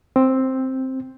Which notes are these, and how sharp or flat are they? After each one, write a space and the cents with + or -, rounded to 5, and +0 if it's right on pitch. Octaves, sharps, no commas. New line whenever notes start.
C4 +5